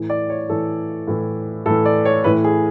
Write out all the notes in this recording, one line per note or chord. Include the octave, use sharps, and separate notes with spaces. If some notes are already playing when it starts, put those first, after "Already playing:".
Already playing: A2 E3
D5
C#5
A2 E3 A4
A2 E3
A2 E3 A4
D5
C#5
A2 E3 B4
G#4